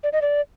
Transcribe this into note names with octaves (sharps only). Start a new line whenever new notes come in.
D5
D#5
D5